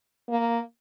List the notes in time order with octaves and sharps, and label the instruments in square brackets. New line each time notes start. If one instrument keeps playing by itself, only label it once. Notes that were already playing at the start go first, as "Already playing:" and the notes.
[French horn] A#3